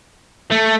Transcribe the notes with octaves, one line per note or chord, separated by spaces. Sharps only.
A3